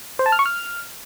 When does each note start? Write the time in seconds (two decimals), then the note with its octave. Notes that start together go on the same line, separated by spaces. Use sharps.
0.19 C5
0.26 A5
0.32 F6
0.39 C#6
0.46 F6